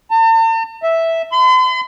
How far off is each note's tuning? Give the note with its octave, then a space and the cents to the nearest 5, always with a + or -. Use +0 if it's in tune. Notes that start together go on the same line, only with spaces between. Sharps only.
A5 +45
E5 -5
C6 -45